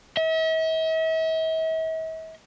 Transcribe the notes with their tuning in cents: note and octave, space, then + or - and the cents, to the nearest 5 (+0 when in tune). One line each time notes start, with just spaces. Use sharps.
E5 -45